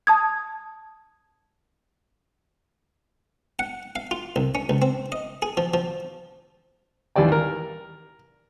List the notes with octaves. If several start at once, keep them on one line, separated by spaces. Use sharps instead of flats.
A5 D#6 G#6
F#5
F5
F4
C2
C#4
C#2
C4
D#5
G#4
F3
F3
D#2 E3 G3 D5 G5
A#4